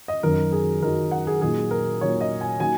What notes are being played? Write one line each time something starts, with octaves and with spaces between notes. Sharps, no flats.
D#5
F#2 D#3 F#3 A#4
G#4
F#2 D#3 F#3 A#4
F#5
G#4
A#2 F#3 D#4 G#4
A#4
A#2 F#3 D#4 C#5
D#5
G#5
F#3 A#3 D#4 G#5